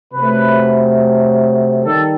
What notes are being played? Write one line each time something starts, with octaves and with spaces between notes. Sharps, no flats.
C3 F#3 A3 B4
D#3 G3 A4